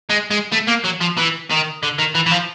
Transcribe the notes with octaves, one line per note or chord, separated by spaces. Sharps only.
G#3
G#3
A3
A#3
F#3
F3
E3
D#3
D3
D#3
E3
E3
F3